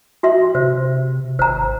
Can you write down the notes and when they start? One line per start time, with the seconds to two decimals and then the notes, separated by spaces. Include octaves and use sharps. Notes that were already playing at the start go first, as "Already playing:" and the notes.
0.23 F#4 E5 C6
0.55 C3 C5
1.39 G#1 C5 A#5